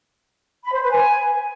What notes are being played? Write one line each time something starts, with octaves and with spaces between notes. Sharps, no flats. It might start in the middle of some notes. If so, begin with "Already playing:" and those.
B5
C5
B4
G#5